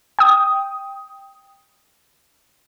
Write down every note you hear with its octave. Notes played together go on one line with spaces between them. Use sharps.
G5 D#6